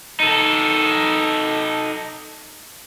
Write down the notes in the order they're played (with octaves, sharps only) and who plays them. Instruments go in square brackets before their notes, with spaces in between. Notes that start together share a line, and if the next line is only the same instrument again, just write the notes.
[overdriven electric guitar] D#4 A4